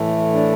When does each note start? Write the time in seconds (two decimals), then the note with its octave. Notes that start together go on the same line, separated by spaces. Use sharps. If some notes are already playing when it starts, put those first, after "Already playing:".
Already playing: A2 E3 A3
0.33 D4